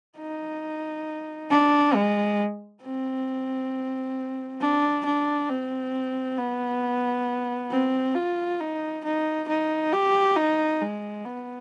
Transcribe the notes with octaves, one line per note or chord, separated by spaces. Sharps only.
D#4
D4
G#3
C4
D4
D4
C4
B3
C4
F4
D#4
D#4
D#4
G4
D#4
G#3
B3